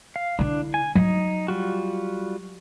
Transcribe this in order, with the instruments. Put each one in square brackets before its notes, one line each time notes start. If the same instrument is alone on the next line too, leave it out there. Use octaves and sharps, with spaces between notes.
[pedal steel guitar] F5
[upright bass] D3 E4 [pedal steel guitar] D4
[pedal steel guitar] G#5
[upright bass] F#3 [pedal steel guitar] D#4
[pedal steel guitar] G3 F4 F#4